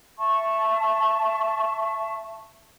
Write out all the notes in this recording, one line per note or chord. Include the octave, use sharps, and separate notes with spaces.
E5 A5 C#6